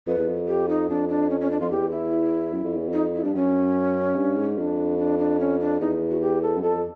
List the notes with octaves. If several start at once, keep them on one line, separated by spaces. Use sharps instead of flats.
F2 B4
E2
F2
G4
D#4
F2 D4
D4
C#4
C#4
D4
F2 F4
E2 G4
E4
F#2
F2
E2
F2 D#4
E4
G2 D4
F#2 C#4
G2
G#2
F2 D4
D4
D4
C#4
D4
E2 D#4
F#4
G4
A4
F#2
F2 A4